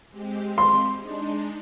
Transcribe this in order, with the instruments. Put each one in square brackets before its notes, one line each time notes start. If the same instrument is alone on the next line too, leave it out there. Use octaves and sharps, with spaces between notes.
[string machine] G#3 C4 G4
[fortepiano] C6
[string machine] G#3 D4 D#4